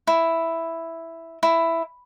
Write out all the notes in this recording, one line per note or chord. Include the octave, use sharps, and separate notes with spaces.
E4
E4